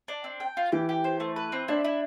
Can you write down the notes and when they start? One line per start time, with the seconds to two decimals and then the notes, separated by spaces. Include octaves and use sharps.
0.08 D4
0.24 C4
0.40 G5
0.57 F4
0.72 E3 G4
0.89 G4
1.04 C5
1.20 A3
1.36 B4
1.52 C4
1.68 D4 E4
1.84 E4